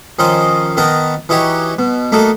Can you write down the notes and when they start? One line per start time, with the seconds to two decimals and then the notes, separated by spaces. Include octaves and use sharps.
0.19 D#3 F3 C#4 D#4 C5 D#5
0.77 D#3 B3 A#4 D#5 A5 A#5
1.29 E3 D#4 E4 F#4 G4 C#5
1.79 B2
2.12 A3 A#3 D#4 F#4 A4